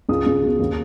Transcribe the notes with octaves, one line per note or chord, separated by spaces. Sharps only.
C#2 D#6
C#2
B2
D#2